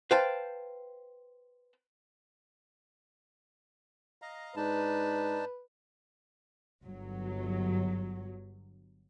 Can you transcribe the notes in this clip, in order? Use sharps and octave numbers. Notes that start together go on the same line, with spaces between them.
B4 C5 F5 G5 A5
D#5 F5 A#5
G#2 D4 D#4 B4 A5
G1 F#3